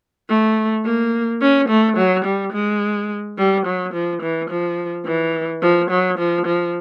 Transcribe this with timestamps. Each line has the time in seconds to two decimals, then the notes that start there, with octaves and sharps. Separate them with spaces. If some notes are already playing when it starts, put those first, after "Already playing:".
0.29 A3
0.85 A#3
1.41 C#4
1.69 A3
1.97 F#3
2.25 G3
2.53 G#3
3.38 G3
3.66 F#3
3.93 F3
4.22 E3
4.50 F3
5.05 E3
5.62 F3
5.90 F#3
6.18 F3
6.46 F3